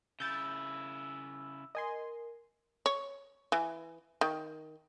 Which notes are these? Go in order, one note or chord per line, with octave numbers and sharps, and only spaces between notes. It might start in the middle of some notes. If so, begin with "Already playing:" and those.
C#3 E4 E6 G6 A6
A#4 D#5 G#5 C6
C#5
E3
D#3